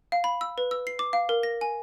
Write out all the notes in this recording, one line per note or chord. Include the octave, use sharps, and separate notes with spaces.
F5
B5
E6
B4
E6
C7
D6
F5
A#4
A#6
G#5